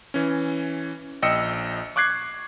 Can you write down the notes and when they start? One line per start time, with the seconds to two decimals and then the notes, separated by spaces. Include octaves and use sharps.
0.14 E3 C#4
1.22 A#1 D#5 G5 E6 C#7
1.96 C#6 D6 F#6 G#6 C7